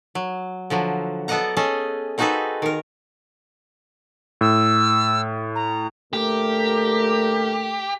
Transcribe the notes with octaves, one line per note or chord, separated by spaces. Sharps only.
F#3
D3 F3 F#3
B3 A4 D5 D#5 F#5 A#5
C#4 G#4 A4 D#5
C4 D#4 F#4 G#4 A4 B4
D#3 A#4
A2 E6
A#5
D2 A#2 A3 G4 A#4